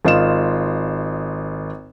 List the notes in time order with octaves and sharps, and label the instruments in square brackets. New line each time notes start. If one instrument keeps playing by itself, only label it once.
[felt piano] G#1 F4 D#5 E7